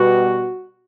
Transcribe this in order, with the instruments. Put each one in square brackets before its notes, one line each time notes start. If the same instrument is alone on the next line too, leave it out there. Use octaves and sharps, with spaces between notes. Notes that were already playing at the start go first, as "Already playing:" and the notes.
Already playing: [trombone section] B2 G3 B3 F#4